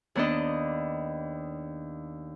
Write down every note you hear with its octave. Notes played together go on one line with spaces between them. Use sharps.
D#2 B3 D4 D5 D#5